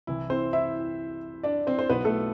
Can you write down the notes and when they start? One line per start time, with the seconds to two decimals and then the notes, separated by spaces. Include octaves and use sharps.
0.07 C2 C3 E3 E4
0.30 C4 C5
0.53 E4 E5
1.43 D4 D5
1.67 C4 C5
1.79 C5
1.89 B1 B2 B3 B4
2.05 A3 A4